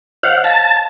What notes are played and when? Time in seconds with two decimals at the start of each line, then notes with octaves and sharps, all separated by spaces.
0.23 C5 C#5 D#5 F5 F#5
0.44 F5 A5